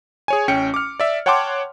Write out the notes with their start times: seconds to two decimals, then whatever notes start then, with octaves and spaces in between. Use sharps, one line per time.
0.28 G#4 C#5 G#5
0.48 A1 C#4 G5 C#7
0.74 D6 F6
1.00 D5 E5
1.26 C#5 F#5 G5 A5 C6 D6